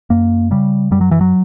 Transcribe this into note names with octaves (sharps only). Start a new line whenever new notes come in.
F#2 A#3
C#3 G3
F#2 G3
F#3
E3
F#3